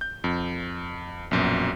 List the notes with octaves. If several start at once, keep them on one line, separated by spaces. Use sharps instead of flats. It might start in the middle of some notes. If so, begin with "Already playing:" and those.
G6
F2
A#1 F#2 B2